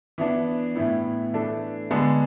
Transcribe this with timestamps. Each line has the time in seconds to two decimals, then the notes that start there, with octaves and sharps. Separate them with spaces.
0.18 E3 B3 D4
0.76 A2 E3 B3 E4
1.33 E3 A3 D4 A4
1.91 D3 G#3 B3 D4 G#4